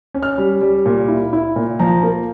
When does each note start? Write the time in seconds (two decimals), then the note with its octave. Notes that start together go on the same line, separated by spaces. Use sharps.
0.14 C#4
0.23 F6
0.38 G3
0.61 G3
0.86 A#2
1.08 E4
1.33 E4
1.56 A#2
1.80 F3 A#5
2.03 A#3